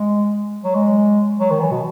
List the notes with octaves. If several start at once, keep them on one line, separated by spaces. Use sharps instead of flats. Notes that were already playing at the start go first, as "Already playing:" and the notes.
Already playing: G#3
F#3
G#3
F#3
D#3
E3
B2